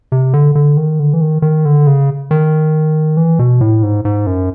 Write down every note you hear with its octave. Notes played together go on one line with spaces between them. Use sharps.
C3
D3
D3
D#3
D3
E3
D#3
D#3
D3
C#3
D#3
E3
B2
A2
G#2
G#2
F#2